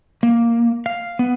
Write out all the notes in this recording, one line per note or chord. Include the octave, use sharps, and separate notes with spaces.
A#3
F5
B3